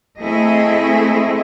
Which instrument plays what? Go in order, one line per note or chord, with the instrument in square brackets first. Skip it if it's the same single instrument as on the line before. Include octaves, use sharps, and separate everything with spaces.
[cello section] A3 C4 E4 G#4 D#5